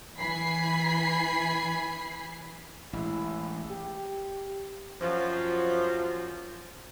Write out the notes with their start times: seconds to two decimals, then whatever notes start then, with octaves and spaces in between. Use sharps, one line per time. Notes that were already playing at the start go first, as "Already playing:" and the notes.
0.19 E3 G#5 B5 C7
2.93 A1 G#3 E4
3.69 G4
5.01 F#2 F3